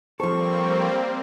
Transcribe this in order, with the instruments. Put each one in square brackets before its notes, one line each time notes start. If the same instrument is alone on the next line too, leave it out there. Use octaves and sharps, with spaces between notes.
[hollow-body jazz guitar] F3 A4 [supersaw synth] G3 A#3 C4 [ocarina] C5 [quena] C#6